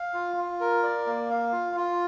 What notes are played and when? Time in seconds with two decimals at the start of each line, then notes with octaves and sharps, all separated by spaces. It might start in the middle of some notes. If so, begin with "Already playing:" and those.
Already playing: F5
0.14 F4
0.37 F4
0.60 A#4
0.83 D5
1.06 A#3
1.30 F5
1.52 F4
1.76 F4